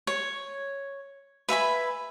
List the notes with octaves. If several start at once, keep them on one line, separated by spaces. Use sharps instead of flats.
C#5
B4 E5 G#5 B5